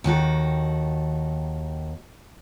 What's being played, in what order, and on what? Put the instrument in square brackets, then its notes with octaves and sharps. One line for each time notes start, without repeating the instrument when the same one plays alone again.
[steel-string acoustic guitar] D#2 D#3 F#4 A4